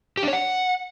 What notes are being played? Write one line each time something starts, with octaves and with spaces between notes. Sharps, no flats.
G4
D4
C#5
F#5